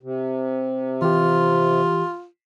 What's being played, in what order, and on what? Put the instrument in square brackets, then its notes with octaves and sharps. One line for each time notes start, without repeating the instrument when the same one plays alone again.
[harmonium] C3
[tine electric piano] E3 G4 [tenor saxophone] F4